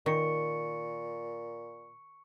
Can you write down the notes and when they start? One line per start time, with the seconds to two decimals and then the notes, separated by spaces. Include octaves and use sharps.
0.06 A#2 D#3 C#6 C#7